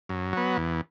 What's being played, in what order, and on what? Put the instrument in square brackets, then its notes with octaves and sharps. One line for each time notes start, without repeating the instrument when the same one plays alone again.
[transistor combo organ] F#2
F#3 B3
E2